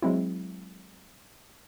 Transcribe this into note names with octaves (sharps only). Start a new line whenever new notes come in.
F#3 G#3 C4 E4